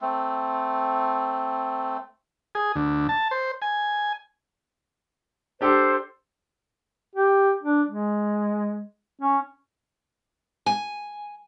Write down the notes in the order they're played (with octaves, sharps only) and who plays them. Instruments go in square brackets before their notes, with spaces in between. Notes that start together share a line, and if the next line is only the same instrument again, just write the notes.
[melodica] A3 C4
[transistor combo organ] G#4
D2
A5
C5
G#5
[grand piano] D4 G4 A4 [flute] C5
[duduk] G4
D4
G#3
C#4
[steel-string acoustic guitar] G#5